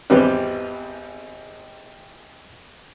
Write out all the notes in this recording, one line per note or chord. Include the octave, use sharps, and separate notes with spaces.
G#1 E2 G3 C4 G4 B4